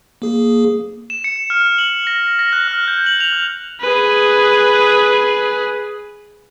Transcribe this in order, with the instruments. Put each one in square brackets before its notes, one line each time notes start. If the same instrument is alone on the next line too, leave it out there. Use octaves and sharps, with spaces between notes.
[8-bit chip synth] A#3 G#4
[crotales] E7
C#7
F6
F#7
A#6
A#6
F#6
F6
G6
F#7
F7
F6
[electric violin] G#4 B4